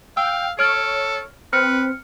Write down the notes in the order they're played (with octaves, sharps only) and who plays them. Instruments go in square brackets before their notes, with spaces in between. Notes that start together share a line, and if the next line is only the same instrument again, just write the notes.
[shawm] F5 [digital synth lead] G5 [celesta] E6
[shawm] A4 [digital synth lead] C#5 [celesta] F6 D7
[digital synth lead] C4 [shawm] B4 [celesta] F6 C#7